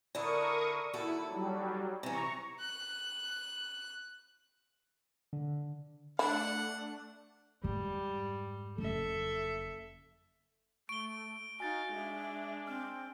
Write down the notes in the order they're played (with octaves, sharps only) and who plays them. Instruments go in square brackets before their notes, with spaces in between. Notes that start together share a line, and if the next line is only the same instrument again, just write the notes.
[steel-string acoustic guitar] D3 D4 E4 [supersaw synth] A#4 C#6 D#6
[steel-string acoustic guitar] D#2 F#4 A4 [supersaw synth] E4
[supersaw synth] F#3 G3
[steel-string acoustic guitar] C3 E3 [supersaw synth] A#5 C#6
[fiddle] F#6
[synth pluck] D3
[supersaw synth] A3 D4 [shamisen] E4 [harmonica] F#5
[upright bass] F2 G#2 [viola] G3
[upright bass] F#1 F2 [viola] A4 E5
[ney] A3 [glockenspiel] C#6 [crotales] D7 G7
[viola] D#4 F5 [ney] F#4 [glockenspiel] G#5 A6
[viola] G#3 D4 [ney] E5
[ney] C4 [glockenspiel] F6